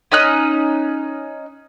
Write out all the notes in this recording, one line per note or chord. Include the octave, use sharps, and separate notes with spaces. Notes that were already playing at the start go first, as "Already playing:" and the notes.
C#4 D#4 D#6 F#6